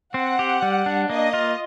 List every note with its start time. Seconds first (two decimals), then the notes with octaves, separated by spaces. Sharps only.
0.14 C4 F#5
0.39 G4
0.62 G3
0.86 D4
1.10 A#3 D#5
1.33 F4